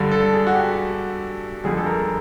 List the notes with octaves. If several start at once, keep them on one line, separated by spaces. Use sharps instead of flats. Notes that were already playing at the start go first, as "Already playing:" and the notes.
Already playing: G2 D3 G3
A4
G#4
F#4
G4
F2 D3 G3 G#4
A4
A#4